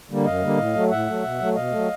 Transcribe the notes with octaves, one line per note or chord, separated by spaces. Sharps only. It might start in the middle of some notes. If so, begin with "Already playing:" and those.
D3 G3 A#3
F#2 D#5 F5
D3 G3 A#3
A2
F#3 A3
A2 E5 F#5
F#3 A3
B2
F#3 A3
B2 D#5 F5
F#3 A3